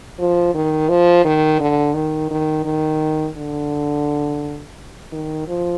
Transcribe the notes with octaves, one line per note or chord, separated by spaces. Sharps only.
F3
D#3
F3
D#3
D3
D#3
D#3
D#3
D3
D#3
F3